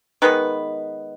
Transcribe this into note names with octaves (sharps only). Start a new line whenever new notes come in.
D#3 G#3 B3 B4